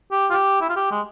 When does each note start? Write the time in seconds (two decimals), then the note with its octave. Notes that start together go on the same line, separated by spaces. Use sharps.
0.12 G4
0.30 F4
0.33 G4
0.61 E4
0.69 F4
0.76 G4
0.91 G#3